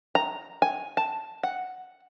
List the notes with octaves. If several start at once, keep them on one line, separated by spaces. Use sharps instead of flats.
A#5
G#5
A5
F#5